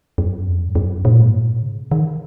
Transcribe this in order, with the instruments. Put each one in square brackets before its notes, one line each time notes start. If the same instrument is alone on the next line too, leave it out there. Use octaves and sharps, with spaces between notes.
[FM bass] F#2
F2
G#2
F#2
A#2
G#2
A#2
C#3
D#3